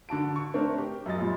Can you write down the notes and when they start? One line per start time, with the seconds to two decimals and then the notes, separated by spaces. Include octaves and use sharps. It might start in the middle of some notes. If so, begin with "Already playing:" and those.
0.09 D3 F#4 A5 D7
0.36 C#6
0.54 A3 C4 D4 A#4
0.78 G4
1.06 F#2 F#3 D#5 A6
1.18 F#2 A#2 G3